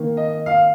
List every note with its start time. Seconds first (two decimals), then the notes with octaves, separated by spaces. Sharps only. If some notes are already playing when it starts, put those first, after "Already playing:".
Already playing: D#3 A#3
0.17 D#5
0.46 F5